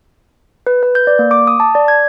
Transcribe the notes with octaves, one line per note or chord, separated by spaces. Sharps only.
B4
B4
G6
D5
A#3
D6
D#6
A5
D5
G#6